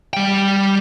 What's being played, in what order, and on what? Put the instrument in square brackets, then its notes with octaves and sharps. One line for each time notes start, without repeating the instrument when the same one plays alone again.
[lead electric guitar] G3 G5